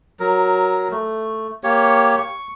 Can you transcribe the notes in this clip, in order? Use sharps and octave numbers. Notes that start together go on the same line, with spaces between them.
F#3 A#4
A3
A#3 G4 C#5
C#6